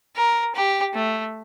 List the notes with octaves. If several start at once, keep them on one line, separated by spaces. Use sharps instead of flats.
A#4
G4
A3